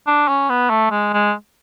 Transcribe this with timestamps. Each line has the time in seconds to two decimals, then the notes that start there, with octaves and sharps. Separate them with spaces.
0.07 D4
0.28 C#4
0.50 B3
0.70 A3
0.91 G#3
1.14 G#3